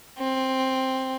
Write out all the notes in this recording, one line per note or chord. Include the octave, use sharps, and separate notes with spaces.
C4